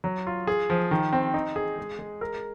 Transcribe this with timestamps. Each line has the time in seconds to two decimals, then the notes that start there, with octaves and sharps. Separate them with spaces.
0.04 F#3
0.27 F4
0.47 G#4
0.70 F3
0.91 D#3
1.13 C4
1.34 D#4
1.56 G#4
1.78 G#3
1.99 G#3
2.21 A#4